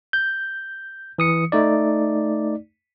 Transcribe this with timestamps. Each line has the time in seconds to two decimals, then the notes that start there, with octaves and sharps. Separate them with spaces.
0.13 G6
1.18 E3 D#6 C#7
1.52 A3 D#4 D5